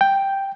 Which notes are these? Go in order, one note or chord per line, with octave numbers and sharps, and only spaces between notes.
G5